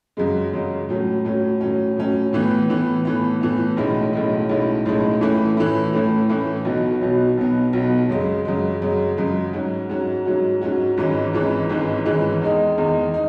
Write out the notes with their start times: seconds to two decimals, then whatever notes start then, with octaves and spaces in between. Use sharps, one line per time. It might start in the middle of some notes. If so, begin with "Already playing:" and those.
0.17 F#2 C#3 G#3
0.53 F#2 C#3 G#3
0.89 A2 F#3 C#4
1.25 A2 F#3 C#4
1.61 A2 F#3 C#4
1.97 A2 F#3 C#4
2.33 A2 E3 B3
2.69 A2 E3 B3
3.05 A2 E3 B3
3.41 A2 E3 B3
3.77 B1 A2 G#3 C#4 E4
4.13 B1 A2 G#3 C#4 E4
4.49 B1 A2 G#3 C#4 E4
4.86 B1 A2 G#3 C#4 E4
5.21 A2 E3 A3 C#4 E4
5.57 A2 E3 A3 C#4 E4
5.93 A2 E3 A3 C#4 E4
6.29 A2 E3 A3 C#4 E4
6.65 B1 B2 F#3 B3
7.01 B1 B2 F#3 B3
7.37 B1 B2 F#3 B3
7.73 B1 B2 F#3 B3
8.09 F#2 C#3 G#3
8.45 F#2 C#3 G#3
8.82 F#2 C#3 G#3
9.17 F#2 C#3 G#3
9.53 G#2 F#3 C#4 F#4
9.89 G#2 F#3 C#4 F#4
10.25 G#2 F#3 C#4 F#4
10.61 G#2 F#3 C#4 F#4
10.97 G#1 G#2 E3 G#3 C#4
11.33 G#1 G#2 E3 G#3 C#4
11.69 G#1 G#2 E3 G#3 C#4
12.06 G#1 G#2 E3 G#3 C#4
12.41 E2 D#3 G#3 D#4
12.78 E2 D#3 G#3 D#4
13.14 D#4